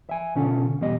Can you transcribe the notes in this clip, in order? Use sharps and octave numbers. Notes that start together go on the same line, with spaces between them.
E5 G#5
B2 D3 C#4 F4 A4
E2 B2 G3 D#5